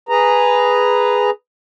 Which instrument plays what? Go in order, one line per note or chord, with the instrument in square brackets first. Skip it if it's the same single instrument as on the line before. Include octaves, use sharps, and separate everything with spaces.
[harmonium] G#4 B4 A#5